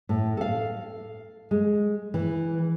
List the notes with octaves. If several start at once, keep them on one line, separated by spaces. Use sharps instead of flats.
A2
A4 F5
G#3
E3